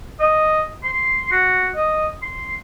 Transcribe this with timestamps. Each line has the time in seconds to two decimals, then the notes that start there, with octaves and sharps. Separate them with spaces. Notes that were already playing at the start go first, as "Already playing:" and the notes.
0.20 D#5
0.84 C6
1.31 F#4
1.76 D#5
2.22 C6